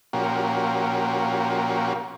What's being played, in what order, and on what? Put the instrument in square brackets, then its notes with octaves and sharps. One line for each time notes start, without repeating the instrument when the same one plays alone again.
[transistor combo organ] A#2 F3 C#4 F#4 G4 A#4